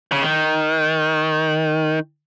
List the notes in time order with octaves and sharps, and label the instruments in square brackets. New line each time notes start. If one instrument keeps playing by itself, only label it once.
[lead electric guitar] C#3
D#3